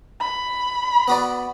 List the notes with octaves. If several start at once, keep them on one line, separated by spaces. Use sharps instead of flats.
B5
B3 F#4 D5